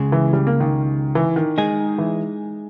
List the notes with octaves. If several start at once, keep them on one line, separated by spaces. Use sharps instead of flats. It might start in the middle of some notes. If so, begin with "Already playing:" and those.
Already playing: C#2 C#3 G#3
E3
G3
A#3
D#3
E3
D#3
G#3 D#4 G#4
E3